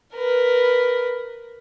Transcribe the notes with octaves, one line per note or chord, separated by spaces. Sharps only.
A#4 B4